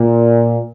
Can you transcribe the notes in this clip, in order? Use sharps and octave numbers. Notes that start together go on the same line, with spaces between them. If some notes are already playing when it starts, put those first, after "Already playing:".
Already playing: A#2